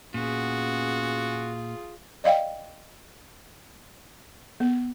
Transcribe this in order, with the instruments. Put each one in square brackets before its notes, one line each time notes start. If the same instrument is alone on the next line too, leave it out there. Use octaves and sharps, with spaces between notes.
[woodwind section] E2 B3 C#4 [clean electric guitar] A#2 [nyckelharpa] F4 G#4 [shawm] F#4
[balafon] D5 D#5 F5 G5
B3